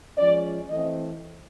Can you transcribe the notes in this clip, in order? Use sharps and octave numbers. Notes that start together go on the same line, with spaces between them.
F3 G#3 C#4 D5
E3 A3 C4 D#5